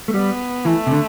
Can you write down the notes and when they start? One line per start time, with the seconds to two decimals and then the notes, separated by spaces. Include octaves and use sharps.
0.08 A3
0.14 G3 B3
0.65 E3 A3
0.86 C3
0.91 D3